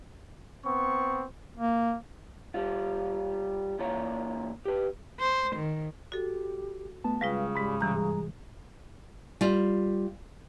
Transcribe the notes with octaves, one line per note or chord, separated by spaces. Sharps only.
B3 C4 C#6
A#3
G3 F4
A#2 E3 A#3 F4 C#5 A#5
G4 B4
C5
D#3
F#4 G4 A4
A3 B3 A5
C#3 G3 G#3 F4 B4 F5
G#2 G3 G#3 B5
G2 C3 E3 G3 G#4 A#5 F#6
G3 F4